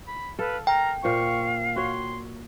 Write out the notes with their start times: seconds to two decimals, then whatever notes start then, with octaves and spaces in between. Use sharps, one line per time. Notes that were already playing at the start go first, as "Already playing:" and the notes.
0.08 B5
0.39 A4 B4 F5
0.67 A#4 G5 A#5
1.03 A#2 C5 F5 C#6
1.76 F#4 C#5 C6